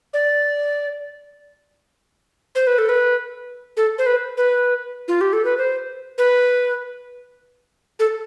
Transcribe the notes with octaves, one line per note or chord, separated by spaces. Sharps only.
D5
C5
B4
A4
B4
A4
C5
B4
B4
F4
G4
A4
B4
C5
B4
A4